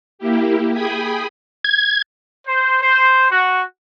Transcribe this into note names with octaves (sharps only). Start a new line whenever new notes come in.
A#3 E4 G4
G#4 G5 G#5 B5 D#6
G#6
C5
C5
F#4